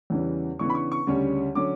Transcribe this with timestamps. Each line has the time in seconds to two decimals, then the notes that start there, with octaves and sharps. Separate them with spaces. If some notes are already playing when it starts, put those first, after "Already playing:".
0.10 E2 C#3 E3 G3 C#4
0.59 C#3 E3 B3 D4 C#6
0.70 B5
0.75 C#6
0.92 C#6
1.07 D2 C#3 G3 C#4
1.55 D3 F#3 C#4 D6